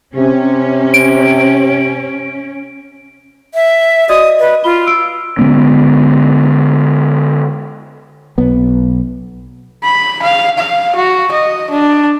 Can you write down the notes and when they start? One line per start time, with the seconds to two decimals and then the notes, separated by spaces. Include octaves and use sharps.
0.15 C3 C#4
0.94 D7
3.54 E5
4.09 F#4 D5 D#5 D#6
4.40 B4
4.64 F4 B5 G7
4.87 E6 D7
5.39 D3 G#3 B3 C#4
8.38 B1 B3
9.83 B5
10.23 F5
10.58 F5
10.96 F#4
11.32 D#5
11.70 D4